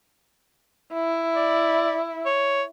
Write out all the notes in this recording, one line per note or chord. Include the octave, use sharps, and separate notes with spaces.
E4
D5
C#5